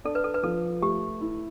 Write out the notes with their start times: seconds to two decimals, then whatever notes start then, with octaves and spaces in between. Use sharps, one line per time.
0.04 D4 A4
0.15 B4
0.24 A4
0.34 B4
0.43 F3 A4
0.82 A3 G4
1.21 E4